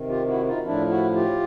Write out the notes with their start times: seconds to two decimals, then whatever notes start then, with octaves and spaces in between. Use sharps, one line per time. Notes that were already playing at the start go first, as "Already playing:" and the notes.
Already playing: C3 D#3
0.09 F4 G4
0.28 E4 F#4
0.46 D#4 F4
0.65 A2 F3 D4 E4
0.89 E4 F#4
1.14 F4 G4